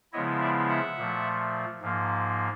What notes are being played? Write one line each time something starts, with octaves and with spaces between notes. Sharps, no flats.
C#3 F3 G#3 B3 E4 C#5 D#5
D5 E5
E5 F#5
A#2 F3 A3
G#2 F3 A#3